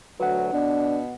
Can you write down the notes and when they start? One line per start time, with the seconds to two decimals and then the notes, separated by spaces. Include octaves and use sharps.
0.20 D2 F#3 B4 F#5
0.53 B2 D4